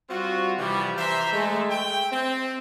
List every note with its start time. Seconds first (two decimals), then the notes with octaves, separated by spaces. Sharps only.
0.10 G3 C4 F4 F#4
0.58 C3 E3 F3 G3
0.98 E3 C5 E5 A#5 C6
1.33 G#3 A3
1.70 E5 G5
2.12 C4